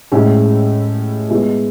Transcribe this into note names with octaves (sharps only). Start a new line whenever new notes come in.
A2 G#3 C#4 E4
B2 G#3 B3 E4